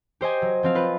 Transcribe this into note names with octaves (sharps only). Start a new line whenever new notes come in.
G4 C5 D#5 G#5
F#3
F3 C4 F5
F4 B4